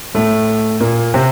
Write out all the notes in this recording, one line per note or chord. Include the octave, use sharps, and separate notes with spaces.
A2 A3
A#2 A#3
C3 C4